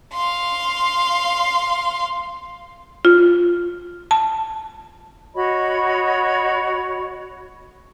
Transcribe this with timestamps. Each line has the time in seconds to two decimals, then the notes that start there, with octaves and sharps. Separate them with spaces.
0.13 F5 C6
3.05 F4
4.11 A5
5.35 F#4 C#5 D#5 B5